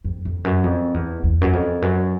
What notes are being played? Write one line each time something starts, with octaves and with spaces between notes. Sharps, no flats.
F2
F2
F#2
F2
E2
E2
F#2
F2
F#2